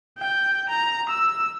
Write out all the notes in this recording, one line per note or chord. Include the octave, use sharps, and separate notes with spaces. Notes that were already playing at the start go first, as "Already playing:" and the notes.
G5
A#5
E6